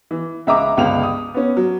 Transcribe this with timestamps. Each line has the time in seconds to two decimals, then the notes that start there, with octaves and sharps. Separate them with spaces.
0.11 E3
0.47 C#2 E5 A#5 D6
0.77 G1 C#2 C#3 F5 F7
1.03 D#6
1.34 B3 C#4
1.57 F#3